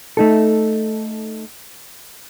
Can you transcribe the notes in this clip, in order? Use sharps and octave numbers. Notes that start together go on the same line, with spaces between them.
A3 D#4 A4